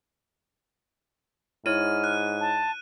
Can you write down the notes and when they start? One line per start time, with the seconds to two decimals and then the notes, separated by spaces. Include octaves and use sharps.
1.66 G#2 E4 C#5 F6 D#7
2.04 F#6
2.41 A5